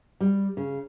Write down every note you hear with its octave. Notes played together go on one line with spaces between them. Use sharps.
G3
C#3